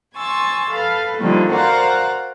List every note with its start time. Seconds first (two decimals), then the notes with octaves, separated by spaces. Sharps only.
0.16 G#5 C6 C#6 E6 A6
0.70 A4 B4 F5
1.18 D3 D#3 F3 G3 A3 A#3
1.51 F#4 A#4 C5 D5 F5 F#5